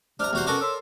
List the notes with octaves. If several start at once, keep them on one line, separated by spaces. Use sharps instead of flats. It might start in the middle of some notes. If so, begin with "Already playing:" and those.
C3 D4 A#5 F6
E2 F#4 C5
B2 C#4 F#4 A4 A#4 D5
C#5 C6 E6